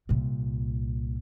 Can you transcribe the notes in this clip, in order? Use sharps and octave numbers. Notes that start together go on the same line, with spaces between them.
C2 A#2